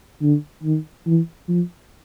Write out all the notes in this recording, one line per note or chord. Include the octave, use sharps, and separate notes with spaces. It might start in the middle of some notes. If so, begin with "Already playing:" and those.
D3
D#3
E3
F3